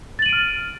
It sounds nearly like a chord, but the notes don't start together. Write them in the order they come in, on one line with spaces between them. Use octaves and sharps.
A6 F#7 D#7 D7 F6